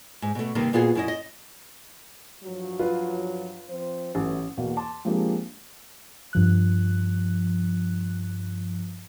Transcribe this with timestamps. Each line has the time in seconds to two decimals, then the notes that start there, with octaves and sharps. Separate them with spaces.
0.22 G#2
0.35 B2 A3
0.55 G2 C3 D#3 G3 A#3
0.73 A#2 B3 F4 F#4 G#4
0.95 F#2 E4 D#5
1.08 D#5
2.44 G2 F3 F#3
2.79 F4 B4
3.69 F3 C4 C5
4.15 A1 F#3 A3 B3
4.57 E2 B2 A#3 F#4 F5
4.77 A5 C6 D6
5.05 F3 G#3 A#3 C4 D4 G4
6.33 G2 F3 F#6